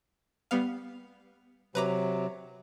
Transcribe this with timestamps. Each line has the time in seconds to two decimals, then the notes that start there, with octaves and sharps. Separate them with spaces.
0.51 G3 B3 F5
1.75 C3 F#3 B4 A#5 D6